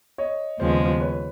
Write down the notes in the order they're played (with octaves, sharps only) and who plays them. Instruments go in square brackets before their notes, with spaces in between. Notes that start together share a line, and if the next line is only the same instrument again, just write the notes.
[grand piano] C#5 D#5
[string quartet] D#2 C#3 F3 G#3 B3 [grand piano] C5
[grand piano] B4 C#5